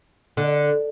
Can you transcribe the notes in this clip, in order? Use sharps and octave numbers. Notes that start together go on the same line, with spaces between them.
D3